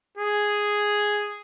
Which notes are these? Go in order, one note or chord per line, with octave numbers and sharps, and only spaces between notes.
G#4